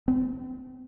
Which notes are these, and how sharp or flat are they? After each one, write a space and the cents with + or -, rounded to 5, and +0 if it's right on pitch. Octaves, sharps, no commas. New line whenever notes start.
C4 -45